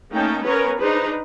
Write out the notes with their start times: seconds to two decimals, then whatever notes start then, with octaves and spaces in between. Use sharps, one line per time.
0.13 A3 A#3 C#4 D#4 G5 A5
0.45 B3 C#4 A#4 B4 C#5 A#5
0.81 D4 D#4 G#4 B4 C5 A#5